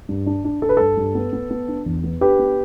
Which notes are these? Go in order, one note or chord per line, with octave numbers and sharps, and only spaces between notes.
G2
D4
D4
D4 A4
B4
G2 A4
G2
B3
B3
B3
D4
E2
B3
D4 G4 B4
B3